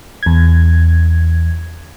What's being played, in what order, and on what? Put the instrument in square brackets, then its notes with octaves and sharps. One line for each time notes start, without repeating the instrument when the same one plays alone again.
[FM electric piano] E2 G#6